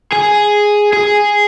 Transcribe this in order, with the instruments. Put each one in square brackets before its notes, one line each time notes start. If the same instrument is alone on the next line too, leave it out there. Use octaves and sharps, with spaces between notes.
[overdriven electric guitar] G#4
G#4